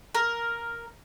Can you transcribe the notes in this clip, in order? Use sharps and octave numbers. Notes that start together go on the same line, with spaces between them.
A#4